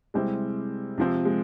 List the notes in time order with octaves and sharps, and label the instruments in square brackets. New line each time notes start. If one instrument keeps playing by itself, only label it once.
[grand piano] C3 G3 C4 E4 G4 [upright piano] G#3
[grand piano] C3 F3 C4
[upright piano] G#3